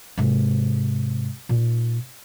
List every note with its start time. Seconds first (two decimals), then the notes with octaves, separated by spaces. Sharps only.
0.18 G#2 C3
1.49 A#2 D#4